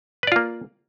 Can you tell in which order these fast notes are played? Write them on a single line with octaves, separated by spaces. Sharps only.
B4 D5 F4 A#3